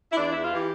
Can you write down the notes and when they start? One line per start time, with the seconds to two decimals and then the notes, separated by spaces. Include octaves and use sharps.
0.11 E4
0.17 E2 D4
0.29 E2 E4
0.42 F4
0.51 E3 G4